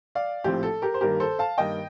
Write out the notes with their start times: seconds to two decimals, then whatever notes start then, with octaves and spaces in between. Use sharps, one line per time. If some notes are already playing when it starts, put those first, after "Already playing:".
0.15 D5 F5
0.44 A#1 A2 F3 C4 G4
0.63 A4
0.82 G4 A#4
0.94 C5
1.01 G2 D#3 A#3 G4 A#4
1.20 A4 C5
1.39 F5 A5
1.58 G2 D#3 A#3 D#5 G5